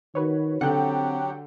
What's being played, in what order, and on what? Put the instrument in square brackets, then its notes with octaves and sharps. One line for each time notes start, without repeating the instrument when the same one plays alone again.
[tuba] D#3 [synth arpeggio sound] F#4 B4 C#5
[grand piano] D3 [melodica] F#3 G4 [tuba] C4 [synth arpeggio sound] F#5 G5